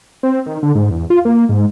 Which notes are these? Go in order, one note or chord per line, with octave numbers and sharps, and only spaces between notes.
C4
D#3
D3
G#2
E2
F4
A#3
G#2